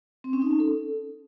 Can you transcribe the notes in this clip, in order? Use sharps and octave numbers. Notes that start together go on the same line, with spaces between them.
C4
C#4
D#4
C#4
A4